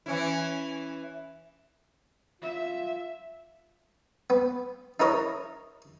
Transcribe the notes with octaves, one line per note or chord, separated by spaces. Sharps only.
E3 C#4 E4
F4 E5
B3
D#4 E4 A#4 C#5 D#5